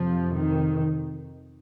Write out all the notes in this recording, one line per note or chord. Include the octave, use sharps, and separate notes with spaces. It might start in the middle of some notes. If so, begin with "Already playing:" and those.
Already playing: F2 C3 F3
D#3